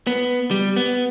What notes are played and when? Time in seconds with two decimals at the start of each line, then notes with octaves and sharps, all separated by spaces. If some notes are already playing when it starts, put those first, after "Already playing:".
0.07 B3
0.51 G3
0.76 B3